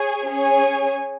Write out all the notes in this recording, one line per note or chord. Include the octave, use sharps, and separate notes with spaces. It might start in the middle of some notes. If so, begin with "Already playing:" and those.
Already playing: G#4 C#5 G#5
C#4 G#4 C#5 G#5